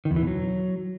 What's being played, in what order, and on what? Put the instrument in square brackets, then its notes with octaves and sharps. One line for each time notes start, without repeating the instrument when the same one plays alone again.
[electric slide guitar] D#3
E2
E3
B2
F#3